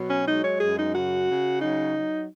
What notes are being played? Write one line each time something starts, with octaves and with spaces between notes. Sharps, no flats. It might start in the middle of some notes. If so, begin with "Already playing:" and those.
Already playing: B2 F#3
C#4
G#3 D#4
C#5
F#2 G#4
D#4
C#3 F#4
C#3
F#3 D#4
F#3